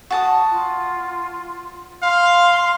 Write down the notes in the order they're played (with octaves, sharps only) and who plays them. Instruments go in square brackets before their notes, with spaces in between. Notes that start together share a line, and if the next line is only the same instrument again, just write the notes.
[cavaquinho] F#4 A5 D#6
[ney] F4
[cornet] F5 [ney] C6